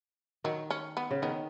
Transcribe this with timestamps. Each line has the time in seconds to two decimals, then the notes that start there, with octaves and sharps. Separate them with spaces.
0.44 D#3 F#3
0.70 C#4
0.97 B3
1.11 C#3
1.22 D#3 B3